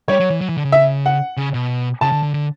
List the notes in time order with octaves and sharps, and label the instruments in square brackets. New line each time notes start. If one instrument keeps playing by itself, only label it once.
[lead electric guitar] G3 [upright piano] C#5
[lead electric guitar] F#3
E3
F#3
E3
D3
C#3
[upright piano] E5
F#5
[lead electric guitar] C#3
B2
[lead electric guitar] C#3 [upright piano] A5
[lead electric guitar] D3
D3
D3